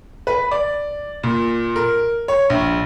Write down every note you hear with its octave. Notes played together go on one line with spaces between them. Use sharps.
B4
D5
A#2
A#4
C#5
A#1